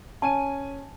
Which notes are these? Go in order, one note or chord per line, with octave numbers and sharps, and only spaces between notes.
C#4 G#5 A5 D#7